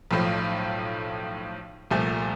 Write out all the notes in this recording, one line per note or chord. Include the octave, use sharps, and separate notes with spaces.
B1 A2 F3
C2 A#2 F3 A3